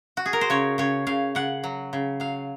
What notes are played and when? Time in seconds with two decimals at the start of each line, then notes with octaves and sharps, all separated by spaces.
0.17 F#4
0.26 G#4
0.33 A#4
0.41 C5
0.50 C#3 C#5
0.78 C#3 C#5
1.07 C#3 F5
1.35 C#3 F#5
1.64 F#3
1.93 C#3
2.20 F#3 F5